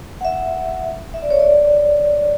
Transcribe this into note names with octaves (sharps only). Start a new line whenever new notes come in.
F#5
E5
E5
D5
C#5
D5